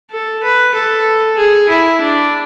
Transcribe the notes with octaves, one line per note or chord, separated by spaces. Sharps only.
A4
B4
A4
G#4
E4
D4